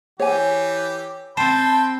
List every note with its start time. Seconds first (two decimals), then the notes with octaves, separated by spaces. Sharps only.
0.20 E3 G4 C#5 G#5
1.37 C4 C5 G5 A5 B5 C6